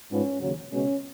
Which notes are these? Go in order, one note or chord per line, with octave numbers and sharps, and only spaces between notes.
G#2 F3 B3 C#4
D#2 C#3 F#3 C#4
C#2 B2 G#3 C#4